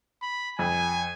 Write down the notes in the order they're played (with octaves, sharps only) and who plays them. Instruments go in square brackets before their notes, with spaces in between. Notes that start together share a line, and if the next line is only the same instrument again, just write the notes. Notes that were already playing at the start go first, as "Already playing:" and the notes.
[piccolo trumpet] B5
[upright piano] F2 [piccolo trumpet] G#5